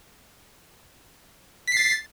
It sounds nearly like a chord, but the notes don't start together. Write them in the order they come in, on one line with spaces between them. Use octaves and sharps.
B6 C7 A6